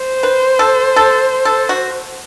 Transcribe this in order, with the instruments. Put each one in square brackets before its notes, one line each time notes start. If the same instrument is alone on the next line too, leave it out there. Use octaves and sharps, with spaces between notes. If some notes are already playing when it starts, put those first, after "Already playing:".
Already playing: [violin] C5
[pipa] B4
A4
A4
A4
F#4